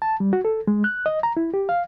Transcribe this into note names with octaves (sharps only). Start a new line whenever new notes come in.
A5
G3
F#4
A4
G#3
F#6
D#5
A#5
E4
G4
F5